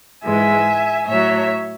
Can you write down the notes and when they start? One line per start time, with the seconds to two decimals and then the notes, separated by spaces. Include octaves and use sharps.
0.24 G#2 E3 G#3 E5 G#5
1.07 A2 F#3 C#5 E5